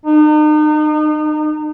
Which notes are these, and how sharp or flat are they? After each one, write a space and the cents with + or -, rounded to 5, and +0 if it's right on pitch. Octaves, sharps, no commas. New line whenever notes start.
D#4 -40